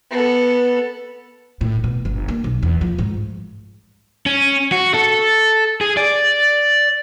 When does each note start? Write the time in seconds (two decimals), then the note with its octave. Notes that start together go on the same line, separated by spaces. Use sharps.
0.10 B3 A4
1.61 A2
1.84 B2
2.05 G1
2.28 A#3
2.44 B1
2.63 E2
2.81 F3
2.98 G#2
4.26 C#4
4.72 F#4
4.94 A4
5.81 G#4
5.97 D5